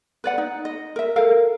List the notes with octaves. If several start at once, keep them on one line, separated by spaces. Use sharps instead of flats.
B4 D5 F#5
D#4
D#5
A#4 E5
A4 A#4 F5